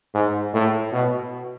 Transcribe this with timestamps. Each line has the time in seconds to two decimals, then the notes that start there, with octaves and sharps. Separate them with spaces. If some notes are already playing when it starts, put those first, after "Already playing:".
0.14 G#2
0.53 A2
0.92 B2